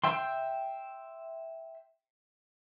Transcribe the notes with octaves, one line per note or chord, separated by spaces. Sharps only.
E5 G5 C6